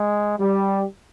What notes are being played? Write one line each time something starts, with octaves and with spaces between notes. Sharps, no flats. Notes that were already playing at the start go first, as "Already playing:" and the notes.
Already playing: G#3
G3